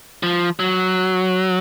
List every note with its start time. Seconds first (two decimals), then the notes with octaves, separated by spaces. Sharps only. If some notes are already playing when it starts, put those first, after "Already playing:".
0.23 F3
0.59 F#3